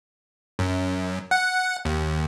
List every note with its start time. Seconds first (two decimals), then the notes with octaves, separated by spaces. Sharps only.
0.59 F#2
1.31 F#5
1.85 D#2